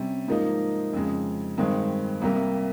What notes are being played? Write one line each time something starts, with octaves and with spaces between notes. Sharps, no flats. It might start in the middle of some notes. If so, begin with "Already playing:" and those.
Already playing: C3 G3 C#4
G#2 F3 A#3 D#4
F2 C#3 G#3
G2 D#3 G#3 C4
C2 C3 G3 A#3